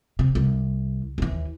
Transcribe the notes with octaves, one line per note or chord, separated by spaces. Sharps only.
C3
C2
D#2 E3